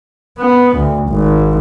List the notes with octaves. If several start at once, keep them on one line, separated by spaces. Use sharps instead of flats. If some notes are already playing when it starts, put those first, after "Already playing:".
B3
D2
G#1